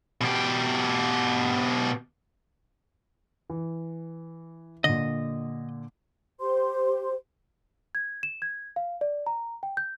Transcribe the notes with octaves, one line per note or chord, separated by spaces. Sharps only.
B2 G4
E3
A#2 D3 D#5
G4 C5 C6
G#6
E7
G#6
F5
D5
A#5
G5
G6